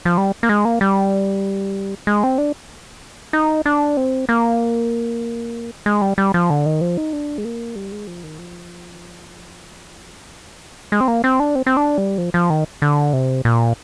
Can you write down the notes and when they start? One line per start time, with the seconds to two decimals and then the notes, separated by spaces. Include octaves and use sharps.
0.05 F3
0.18 G3
0.43 A#3
0.49 G#3
0.65 A#3
0.81 G3
2.07 G#3
2.24 C4
2.38 D4
3.33 D#4
3.66 D4
3.97 C4
4.29 A#3
5.86 G#3
6.02 G3
6.18 G3
6.34 F3
6.50 D3
6.66 D#3
6.81 F3
6.98 D#4
7.13 D4
7.38 G#3
7.45 A#3
7.76 G3
7.92 G#3
8.07 F3
8.23 D#3
8.39 F3
10.92 G#3
11.01 C4
11.08 A#3
11.24 C4
11.40 D4
11.55 C4
11.66 C4
11.77 D4
11.98 G3
12.18 F3
12.34 F3
12.50 D#3
12.82 D3
13.13 C3
13.45 A#2